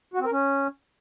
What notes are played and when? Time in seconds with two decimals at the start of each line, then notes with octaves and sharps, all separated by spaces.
0.14 F#4
0.20 C4
0.26 A#4
0.31 C#4